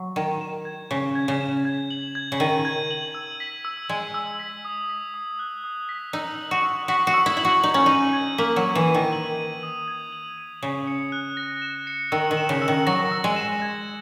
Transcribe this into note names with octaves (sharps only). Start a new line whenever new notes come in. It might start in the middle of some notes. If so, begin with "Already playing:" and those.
Already playing: F#3
D#3 G#6
E7
G#6
C#3 B6
G#6
C#3
E7
G#6
F#7
G#6
C#3
D#3 D#7
G#6
F#7
E6
B6
E6
G#3 G#6
E6
B6
D#6
B6
D#6
F#6
D#6
B6
D#4 E6
F#7
F#4
E6
F#4 B6
F#4
E6
E4
E4 F#7
F#4
D#4 F#7
C#4
D#4 D#7
G#6
A#3 B6
F#3
F#7
E3
D#7
D#3
F#7
D#7
D#6
G#6
F#7
D#7
C#3 E7
C#7
F#6
A#6
E7
C#7
D#3 E6
D#3
E7
C#3
E6
D#3
F#3 A#6
E6
G#3
E7
G#6